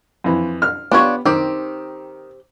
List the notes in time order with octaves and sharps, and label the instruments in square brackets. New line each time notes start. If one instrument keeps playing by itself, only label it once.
[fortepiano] F2 E3
F6
[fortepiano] B3 G4 [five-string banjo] D4 F4 C#5
[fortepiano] D#3 [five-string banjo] C4 G4